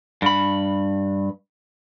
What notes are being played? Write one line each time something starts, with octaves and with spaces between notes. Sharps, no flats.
G2 B5